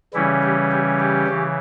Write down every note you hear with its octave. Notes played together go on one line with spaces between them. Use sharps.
C#3 E3 G3 C#4 E4
G4
G4
G4
C#3 E3